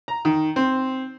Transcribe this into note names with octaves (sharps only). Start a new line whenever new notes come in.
A#5
D#3
C4